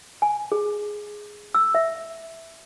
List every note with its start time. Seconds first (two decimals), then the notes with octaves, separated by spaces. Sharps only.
0.22 G#5
0.52 G#4
1.55 E6
1.75 E5